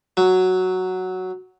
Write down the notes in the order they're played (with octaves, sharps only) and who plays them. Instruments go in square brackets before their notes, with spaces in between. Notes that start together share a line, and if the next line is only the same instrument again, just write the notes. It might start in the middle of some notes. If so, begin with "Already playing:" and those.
[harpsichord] F#3